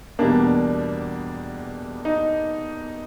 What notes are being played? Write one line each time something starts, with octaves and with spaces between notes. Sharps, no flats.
E2 B2 G3 A#3 D4
D#4